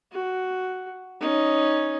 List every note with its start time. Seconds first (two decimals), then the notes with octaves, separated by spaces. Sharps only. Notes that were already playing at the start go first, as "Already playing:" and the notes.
0.12 F#4
1.21 C#4 D#4